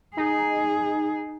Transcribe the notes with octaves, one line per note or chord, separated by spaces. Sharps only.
D#4 G#4